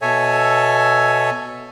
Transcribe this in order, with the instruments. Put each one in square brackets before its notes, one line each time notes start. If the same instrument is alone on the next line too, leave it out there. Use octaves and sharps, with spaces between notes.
[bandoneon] B2 A4 C#5 E5 G#5